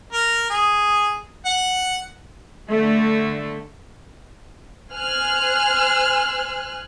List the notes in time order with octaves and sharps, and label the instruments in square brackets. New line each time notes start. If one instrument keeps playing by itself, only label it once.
[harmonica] A#4
G#4
F#5
[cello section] D3 A3
[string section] C5 G#5 F6 F#6